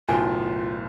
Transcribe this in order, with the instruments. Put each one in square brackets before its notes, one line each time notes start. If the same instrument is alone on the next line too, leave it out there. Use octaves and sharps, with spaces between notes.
[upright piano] F#1 B1 A2 [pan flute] F4 [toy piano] G#5